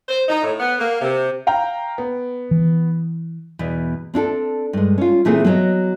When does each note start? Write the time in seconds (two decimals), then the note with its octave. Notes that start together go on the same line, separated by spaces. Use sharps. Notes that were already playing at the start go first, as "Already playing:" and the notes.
0.08 C5
0.29 D#4
0.43 A2
0.60 B3
0.79 A#3
1.01 C3
1.47 F5 G5 A#5
1.98 B3
2.51 E3
3.59 E2 B2
4.14 C4 D4 F4 A4
4.73 G2 G#3
4.98 C#4 F4
5.25 A#2 E3 A3 A#3 C4 G#4
5.44 F#3 B3 A4 C#5 D#5